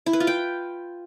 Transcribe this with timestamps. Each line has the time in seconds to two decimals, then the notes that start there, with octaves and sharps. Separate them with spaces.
0.06 E4
0.13 B4
0.20 F4
0.27 G5